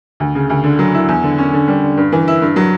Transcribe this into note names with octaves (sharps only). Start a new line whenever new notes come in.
D2
C#3
D2
D3
F#3
E4
E2
D3
C#4
D3
G3
D3
G2
E3
E4
G2
F#3